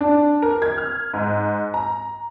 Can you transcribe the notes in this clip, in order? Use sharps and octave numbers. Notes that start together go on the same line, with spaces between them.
D4
A#4
G#6
F6
G#2
A#5